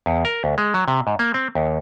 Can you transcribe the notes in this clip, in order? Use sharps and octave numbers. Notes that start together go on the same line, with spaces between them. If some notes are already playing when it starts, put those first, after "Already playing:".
E2
A#4
D2
G#3
F#3
C3
G#2
A#3
C4
D#2